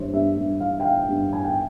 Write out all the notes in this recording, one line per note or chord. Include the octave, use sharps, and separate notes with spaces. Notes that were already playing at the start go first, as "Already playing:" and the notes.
Already playing: G2 E3 C5 C#5
G2 E5
G2
E3 F5
G5
E3 F5
G2
E3 G#5
G5